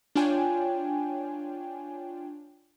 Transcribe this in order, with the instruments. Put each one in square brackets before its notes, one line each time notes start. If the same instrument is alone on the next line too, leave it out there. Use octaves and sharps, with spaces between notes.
[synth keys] D4 F4 C#5 G5 G#5